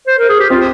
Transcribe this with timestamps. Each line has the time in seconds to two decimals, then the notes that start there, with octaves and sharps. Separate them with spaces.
0.07 C5
0.19 A#4
0.29 G#4
0.39 G4
0.50 C4 F4